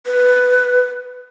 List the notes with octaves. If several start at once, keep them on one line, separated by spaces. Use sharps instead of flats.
B4